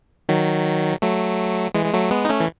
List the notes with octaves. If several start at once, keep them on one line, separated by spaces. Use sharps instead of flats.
D#3 F#3
F#3 A3
E3 G#3
G#3
F#3 A3
G#3 B3
D#4
A3 C#4
E3